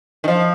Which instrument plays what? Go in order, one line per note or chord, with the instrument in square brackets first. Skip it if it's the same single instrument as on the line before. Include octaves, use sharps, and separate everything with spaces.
[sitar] D#3
F3